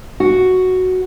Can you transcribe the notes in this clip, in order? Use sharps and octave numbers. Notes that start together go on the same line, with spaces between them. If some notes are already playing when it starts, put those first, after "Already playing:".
F#4